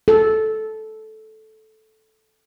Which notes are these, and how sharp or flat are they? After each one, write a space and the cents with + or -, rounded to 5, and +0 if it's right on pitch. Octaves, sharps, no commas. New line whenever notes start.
A4 -10